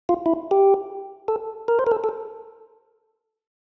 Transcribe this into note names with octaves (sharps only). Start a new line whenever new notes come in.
F4
E4
G4
A4
A#4
C5
A#4
A4
A4